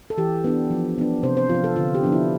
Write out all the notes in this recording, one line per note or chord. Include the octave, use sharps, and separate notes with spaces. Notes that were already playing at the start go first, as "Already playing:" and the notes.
A4
E3 G4
B3 D4
F3
B3 D4
C3 C5
C5
F3 C4 F4
A4
D3 F4
G4
F3 B3 D4
E4